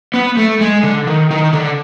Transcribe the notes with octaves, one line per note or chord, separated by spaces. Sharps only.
B3
A3
G#3
D3
D#3
D#3
D3